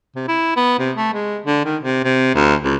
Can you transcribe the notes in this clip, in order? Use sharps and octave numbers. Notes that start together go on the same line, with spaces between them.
C3
E4
B3
C3
A3
G#3
D3
D#3
C3
C3
D2
C#2